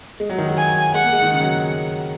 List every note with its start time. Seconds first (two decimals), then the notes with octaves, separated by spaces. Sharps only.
0.20 G#3
0.30 F#3
0.38 D#3
0.49 F#3
0.58 G#5
0.94 G#3 F#5
1.04 A#3
1.12 G#3
1.22 D#3
1.31 C#3
1.40 F#3